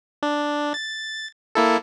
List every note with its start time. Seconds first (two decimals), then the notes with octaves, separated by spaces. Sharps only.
0.23 D4
0.74 A6
1.55 A#3 E4 A4